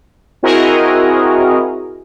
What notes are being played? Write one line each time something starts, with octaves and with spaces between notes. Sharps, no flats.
C4 E4 F#4 G#4 A#4 D#5